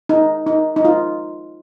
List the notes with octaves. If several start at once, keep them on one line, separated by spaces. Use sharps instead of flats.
D#4
D#4
D#4
F4